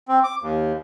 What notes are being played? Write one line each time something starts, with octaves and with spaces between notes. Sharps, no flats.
C4
D6
D#2